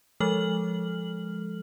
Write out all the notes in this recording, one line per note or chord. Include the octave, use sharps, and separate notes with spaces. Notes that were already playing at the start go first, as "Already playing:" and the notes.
F3 G#3 A4 F6 F#7